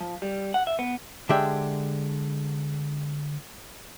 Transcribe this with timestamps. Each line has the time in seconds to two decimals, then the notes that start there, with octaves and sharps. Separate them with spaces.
0.01 F3
0.22 G3
0.54 F#5
0.67 E5
0.79 B3
1.29 D3 G#3 D4 G4 E5